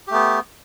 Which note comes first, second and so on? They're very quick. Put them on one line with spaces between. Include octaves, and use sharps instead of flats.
G4 A3 B3